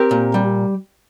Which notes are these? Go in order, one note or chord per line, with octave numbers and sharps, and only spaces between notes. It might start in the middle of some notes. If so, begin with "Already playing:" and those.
Already playing: C4 G4 A#4
A#2
G3